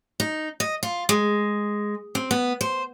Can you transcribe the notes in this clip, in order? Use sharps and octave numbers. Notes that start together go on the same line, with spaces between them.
D#4
D#5
F4
G#3
C4
B3
C5